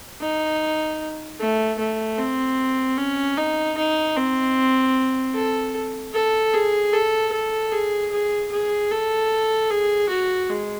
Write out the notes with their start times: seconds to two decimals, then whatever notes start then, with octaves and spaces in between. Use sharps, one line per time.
0.21 D#4
1.40 A3
1.79 A3
2.18 C4
2.97 C#4
3.38 D#4
3.77 D#4
4.17 C4
5.35 A4
6.14 A4
6.54 G#4
6.93 A4
7.33 A4
7.72 G#4
8.12 G#4
8.52 G#4
8.91 A4
9.71 G#4
10.09 F#4
10.50 G#3